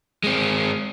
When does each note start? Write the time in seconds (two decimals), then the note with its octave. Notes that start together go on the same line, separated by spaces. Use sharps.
0.24 G#3 C4